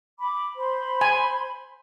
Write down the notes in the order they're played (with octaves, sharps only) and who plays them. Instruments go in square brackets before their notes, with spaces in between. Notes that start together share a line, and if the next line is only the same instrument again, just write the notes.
[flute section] B5 D6
C5 B5 C6
[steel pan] G#5